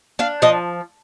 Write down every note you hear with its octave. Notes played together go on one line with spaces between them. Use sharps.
D4 F5
F3 D#5